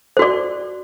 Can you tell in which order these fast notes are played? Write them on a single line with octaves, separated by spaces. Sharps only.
C5 F#4 D5